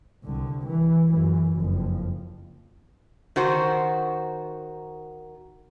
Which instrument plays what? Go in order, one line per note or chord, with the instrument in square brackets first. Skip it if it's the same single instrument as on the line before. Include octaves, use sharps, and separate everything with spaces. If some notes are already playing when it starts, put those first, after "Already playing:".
[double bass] C2 D3
E3
F#2 E3
F#1 F2
[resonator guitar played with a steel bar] D#3 F#4 C5